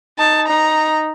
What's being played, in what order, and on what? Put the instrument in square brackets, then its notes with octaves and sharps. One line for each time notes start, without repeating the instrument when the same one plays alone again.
[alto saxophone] D#4 [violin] A5
[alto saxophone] D#4 [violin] A#5